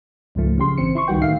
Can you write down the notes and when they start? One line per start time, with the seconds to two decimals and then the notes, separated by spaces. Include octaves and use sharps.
0.35 C#2 G#2 F3 A3
0.58 C#3 F3 G4 C6
0.78 G#1 C#3 E3 C4 C#7
0.95 E4 C6 C#6
1.08 C#2 D#3 G3 F#4 B4 G5
1.21 A2 D3 D#3 E5 F5 C7